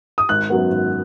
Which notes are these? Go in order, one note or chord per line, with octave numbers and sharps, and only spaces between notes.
D#6
G#1 F#6
F#2 F#3 B3
G#1